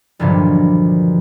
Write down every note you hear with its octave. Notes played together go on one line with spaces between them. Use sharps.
B1 G2 A#2 D3 E3 F3